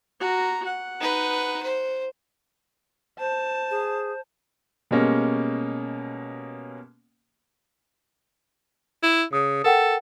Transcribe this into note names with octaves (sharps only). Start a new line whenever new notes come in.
F#4 A#5
F#5
D#4 B4
C5
C5 A5
G#4
B2 G3 G#3 A#3 C#4
E4
C#3 D#6
A4 A#4 F#5 G5